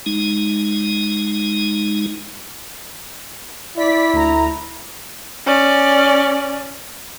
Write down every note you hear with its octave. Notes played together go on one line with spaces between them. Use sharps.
G#3 D#4
E4 D5 B6
D2 A#5
C#4 D5